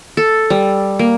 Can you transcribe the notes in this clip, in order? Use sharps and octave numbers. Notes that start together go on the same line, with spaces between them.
A4
G3
A#3